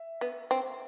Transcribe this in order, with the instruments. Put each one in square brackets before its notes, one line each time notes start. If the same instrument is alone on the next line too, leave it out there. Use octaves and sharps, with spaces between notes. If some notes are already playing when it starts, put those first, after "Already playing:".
Already playing: [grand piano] E5
[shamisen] B3
C4